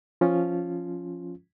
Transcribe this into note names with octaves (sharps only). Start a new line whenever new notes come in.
F3 C#4 F4